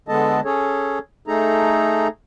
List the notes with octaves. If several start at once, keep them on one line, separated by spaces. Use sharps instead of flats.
D3 G#3 B3 A4 D#5 A5
C#4 G#4 A4 C#5
A3 D#4 G#4 A4 A#5